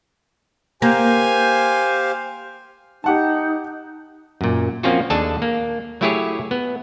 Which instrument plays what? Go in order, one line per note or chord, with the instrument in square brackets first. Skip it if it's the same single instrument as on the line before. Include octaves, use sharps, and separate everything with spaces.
[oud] A#3 [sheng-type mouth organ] G4 C5 F5 [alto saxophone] G#5
[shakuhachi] D#4 [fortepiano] G4 F#5 A5
[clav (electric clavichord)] F#2 A#2
F3 A#3 C4 C#4 F4 F#4
D#2 D4 G#4 A4 A5
A#3
F#3 A3 E4 G4 G#4 C#5
B3